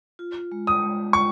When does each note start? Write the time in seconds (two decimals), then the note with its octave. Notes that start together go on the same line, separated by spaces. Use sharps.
0.19 F4
0.52 G#3
0.67 D#6
0.82 G#3
1.13 F4 C#6